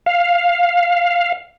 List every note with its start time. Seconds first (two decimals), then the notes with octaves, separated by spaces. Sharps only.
0.06 F5